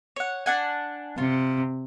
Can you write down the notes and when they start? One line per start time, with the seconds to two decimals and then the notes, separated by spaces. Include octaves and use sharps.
0.16 C#5 F#5
0.46 D4 F#5 G#5
1.18 C3 F4